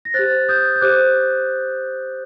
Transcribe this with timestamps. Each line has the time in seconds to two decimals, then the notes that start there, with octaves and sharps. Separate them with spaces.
0.05 A#6
0.14 G4 C5 F#6 A6
0.49 D#6 G6
0.76 G6
0.81 G4 C5 D6 F#6